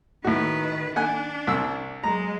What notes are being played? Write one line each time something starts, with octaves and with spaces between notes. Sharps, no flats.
A2 D#3 F#4 B4
D4 F#5 G#5 F#6
C2 E6
F#3 G#3 A#5